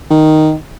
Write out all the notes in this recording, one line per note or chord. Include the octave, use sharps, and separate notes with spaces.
D#3